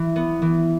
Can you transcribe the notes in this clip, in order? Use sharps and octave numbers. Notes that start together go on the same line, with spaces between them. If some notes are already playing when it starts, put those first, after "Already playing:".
Already playing: E3 E4
B3
E3